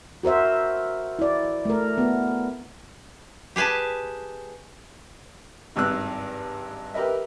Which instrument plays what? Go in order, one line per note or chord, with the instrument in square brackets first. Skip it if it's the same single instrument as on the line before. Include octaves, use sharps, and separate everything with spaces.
[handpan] F#4 A#4 C5 E5
E4 D5
A3 A#4
B3
[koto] G4 G#4 B4 G#5 A5
[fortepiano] G#1 G2 E6 F#6
G4 A#4 B4 D#5 E5